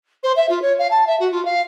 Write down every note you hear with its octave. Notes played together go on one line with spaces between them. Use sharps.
C5
E5
F4
C#5
F5
A5
E5
F#4
F4
F5